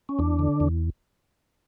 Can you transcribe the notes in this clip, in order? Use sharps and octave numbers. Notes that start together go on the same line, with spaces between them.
C#4
E2 D4
D3
E2